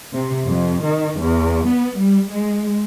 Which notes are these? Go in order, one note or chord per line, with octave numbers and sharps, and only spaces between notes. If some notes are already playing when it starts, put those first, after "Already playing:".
C3
F2
D#3
E2
B3
G3
G#3